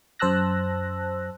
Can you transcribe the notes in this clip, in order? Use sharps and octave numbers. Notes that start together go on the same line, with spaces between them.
F#2 C5 A5 E6 F#6 A#6